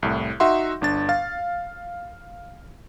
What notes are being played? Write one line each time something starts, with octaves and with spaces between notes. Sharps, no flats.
C2 A2
D#4 F#4 E5 F#5 C6
G1 D4 A6
F5 A6